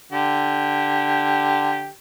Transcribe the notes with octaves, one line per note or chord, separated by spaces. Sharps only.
D3 G4